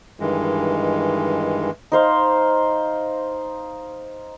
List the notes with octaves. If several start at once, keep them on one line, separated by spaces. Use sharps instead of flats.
G2 D#3 E3 G#3
D#4 C5 F5